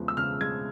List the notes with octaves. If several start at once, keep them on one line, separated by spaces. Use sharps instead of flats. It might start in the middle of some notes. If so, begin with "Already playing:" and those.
Already playing: E2 C#3 F3 G#3
E6
C#3 F6
G#3 G#6